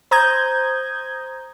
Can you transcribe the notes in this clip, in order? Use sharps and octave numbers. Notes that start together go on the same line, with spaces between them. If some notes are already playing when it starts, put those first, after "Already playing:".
C5 A#5 D#6 G6 G#6